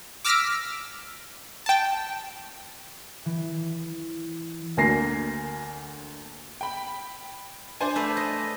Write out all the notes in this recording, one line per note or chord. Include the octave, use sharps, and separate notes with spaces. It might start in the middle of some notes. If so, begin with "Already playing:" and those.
D6 E6 F6 A#6 B6 D7
G5 A5
E3
D2 A#3 G#5 A#6 C7
G5 B5
D4 C5 G#5
A3 B4
D#5